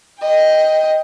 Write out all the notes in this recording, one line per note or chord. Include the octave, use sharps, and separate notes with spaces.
D#5 G5